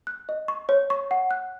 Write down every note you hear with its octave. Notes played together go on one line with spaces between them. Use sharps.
F#6
D#5
C#6
C#5
C#6
F#5
F#6